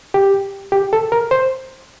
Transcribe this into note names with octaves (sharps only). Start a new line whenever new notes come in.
G4
G4
A4
A#4
C5